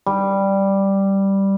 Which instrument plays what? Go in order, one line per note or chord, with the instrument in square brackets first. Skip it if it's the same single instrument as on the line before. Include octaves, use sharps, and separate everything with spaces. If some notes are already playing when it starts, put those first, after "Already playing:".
[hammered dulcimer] G3